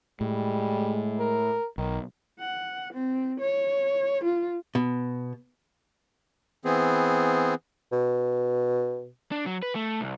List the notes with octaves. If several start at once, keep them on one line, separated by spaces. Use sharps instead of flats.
A2 G3 G#3
A#4
B1 D#3
F#5
C4
C#5
F4
B2
E3 B3 C4 G#4
B2
D4
F#3
B4
A3
C2